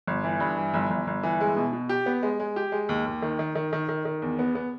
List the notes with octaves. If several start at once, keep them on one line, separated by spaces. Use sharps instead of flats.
G1
E3
G2
E3
G1
G1
G1
E3
G#3
B2
B2
G4
B3
G#3
G#3
G4
G#3
D#2
D#2
D#3
D#3
D#3
D#3
D#3
D#3
E2
B3
B3